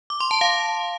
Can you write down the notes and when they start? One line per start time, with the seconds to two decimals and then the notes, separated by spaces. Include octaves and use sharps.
0.10 D6
0.20 C6
0.31 A5
0.41 F5